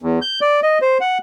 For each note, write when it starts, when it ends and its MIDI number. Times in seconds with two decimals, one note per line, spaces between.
0.02 0.19 40
0.22 0.40 91
0.41 0.60 74
0.63 0.78 75
0.82 0.98 72
1.01 1.18 78